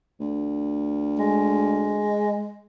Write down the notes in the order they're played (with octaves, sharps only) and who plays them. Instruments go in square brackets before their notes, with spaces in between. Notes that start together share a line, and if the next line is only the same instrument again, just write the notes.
[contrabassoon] D2
[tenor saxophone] G#3